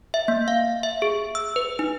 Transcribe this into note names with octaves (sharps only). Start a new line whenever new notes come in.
E5
A#3
F5
E5
G#4
E6
B4
D#4